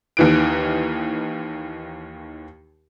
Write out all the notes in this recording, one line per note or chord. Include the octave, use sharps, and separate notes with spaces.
D#2 D#3 E3 F#6 D7